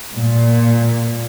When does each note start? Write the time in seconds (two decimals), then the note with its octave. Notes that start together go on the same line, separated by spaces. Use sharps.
0.13 A#2